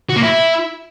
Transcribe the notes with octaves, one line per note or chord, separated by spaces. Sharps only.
F#4
A#3
E4